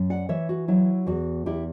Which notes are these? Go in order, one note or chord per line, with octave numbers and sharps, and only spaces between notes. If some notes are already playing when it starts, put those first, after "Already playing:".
Already playing: F#2
D5 F#5
E3 C#5 E5
F#4
F#3 E4
E2 F#4
E2 E4 G4